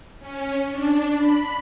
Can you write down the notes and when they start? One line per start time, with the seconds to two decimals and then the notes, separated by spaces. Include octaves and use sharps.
0.20 C#4
0.70 D4
1.17 B5